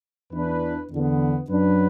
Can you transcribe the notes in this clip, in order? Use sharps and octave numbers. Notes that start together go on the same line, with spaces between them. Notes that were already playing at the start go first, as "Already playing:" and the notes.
E2 E3 D4 B4
E2 D3 B3
F#2 F#3 D4 B4